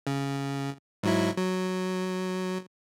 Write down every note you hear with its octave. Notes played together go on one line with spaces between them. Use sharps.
C#3
G#2 F#3 E4
F#3